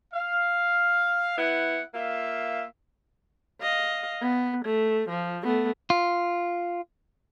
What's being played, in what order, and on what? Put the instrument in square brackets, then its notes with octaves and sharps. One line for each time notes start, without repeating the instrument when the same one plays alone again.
[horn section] F5
B3 E4 F#5
A#3 F4 E5
[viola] D#5 F5
B3
A3
F3
A3 B3
[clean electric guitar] F4